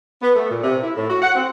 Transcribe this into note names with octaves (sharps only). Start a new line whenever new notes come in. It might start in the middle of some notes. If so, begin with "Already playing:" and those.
B3
A3
A#2
C3
E4
A2
F#4
F#5
C4